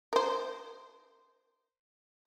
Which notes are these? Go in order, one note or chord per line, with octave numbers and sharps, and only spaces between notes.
A#4 C5